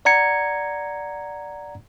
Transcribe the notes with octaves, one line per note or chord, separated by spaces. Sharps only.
D5 F#5 A#5 G#6 C#7